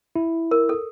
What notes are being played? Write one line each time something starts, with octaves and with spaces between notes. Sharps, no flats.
E4
A#4
A4